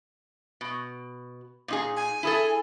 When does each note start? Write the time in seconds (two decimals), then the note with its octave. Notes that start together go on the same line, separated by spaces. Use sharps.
0.61 B2
1.68 A#2 D#4 G#4
1.96 G#5
2.23 E4 G#4 A4